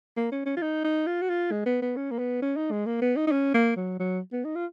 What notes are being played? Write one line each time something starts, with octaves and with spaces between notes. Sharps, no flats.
A#3
C#4
C#4
F4
D#4
D#4
F4
F#4
F4
G#3
B3
B3
C#4
A#3
B3
C#4
D#4
G#3
A#3
B3
D#4
D#4
C#4
A#3
F#3
F#3
B3
D#4
F4